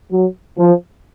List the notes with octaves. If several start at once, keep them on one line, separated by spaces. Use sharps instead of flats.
F#3
F3